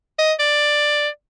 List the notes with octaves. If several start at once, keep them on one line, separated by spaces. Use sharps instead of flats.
D#5
D5